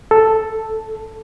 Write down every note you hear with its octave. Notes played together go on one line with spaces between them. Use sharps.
A4